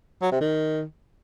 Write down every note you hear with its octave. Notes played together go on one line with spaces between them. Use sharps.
F#3
C3
D#3